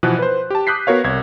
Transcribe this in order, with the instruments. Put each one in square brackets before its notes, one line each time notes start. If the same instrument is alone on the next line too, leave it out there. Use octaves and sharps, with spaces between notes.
[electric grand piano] B2 E3 F3 B3 F#6
B4 C5
G4 A5
D6 D#6 F#6 G6 B6 C7
B3 F#4 A#4 C#5 F5
C2 G#6